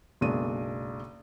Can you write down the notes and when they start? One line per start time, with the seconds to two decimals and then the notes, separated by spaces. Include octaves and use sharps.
0.21 F#1 B1 G#3 D4 D#7